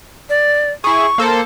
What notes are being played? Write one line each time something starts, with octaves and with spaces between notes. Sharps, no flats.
D5
E4 G#4 C#6
A#3 A4 C5